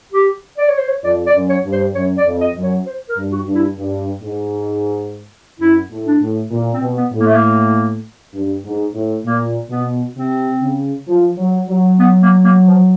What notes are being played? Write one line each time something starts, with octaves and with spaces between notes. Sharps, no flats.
G4
D5
C#5
C5
C#5
F2 D5
D5
F#2
C#5
G2
C5
F#2 C#5
D5
F2
D#5
F#2
C#5
C5
A#4
G2
F#4
G2
E4
G2
G#2
F#2 E4
A2
D4
A2
A#2
C4
B2
B3
A2
A#3
A3
A#3
G2
G#2
A2
A#2 A#3
B2 B3
C3 C4
C#3
F3
F#3
F#3
B3
A#3
A#3
F3